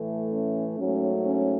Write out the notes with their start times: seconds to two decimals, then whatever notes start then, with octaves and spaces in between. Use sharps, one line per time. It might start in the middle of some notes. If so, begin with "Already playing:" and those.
Already playing: A2 E3 A3
0.32 C#4
0.78 G#2 F#3 A3 C#4
1.26 C#4